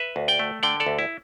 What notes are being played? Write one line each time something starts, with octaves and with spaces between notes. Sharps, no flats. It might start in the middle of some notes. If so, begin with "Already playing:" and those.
Already playing: B4 E5
D2
D5 G5
A3
D3 D5 G5
A4 D5
D2
E4